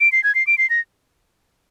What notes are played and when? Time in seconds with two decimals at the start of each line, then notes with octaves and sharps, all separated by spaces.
0.01 D7
0.12 C7
0.24 G#6
0.35 C7
0.47 D7
0.58 C7
0.70 A#6